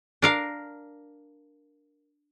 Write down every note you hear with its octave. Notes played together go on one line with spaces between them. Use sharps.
D4 A#4 F5